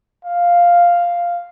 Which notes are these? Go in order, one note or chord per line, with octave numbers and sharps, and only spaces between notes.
F5